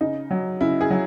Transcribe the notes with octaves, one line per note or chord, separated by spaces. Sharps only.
C#3 D#4
F#3
C#3 E4
G#4
F#3